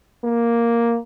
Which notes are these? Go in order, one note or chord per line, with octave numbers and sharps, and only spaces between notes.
A#3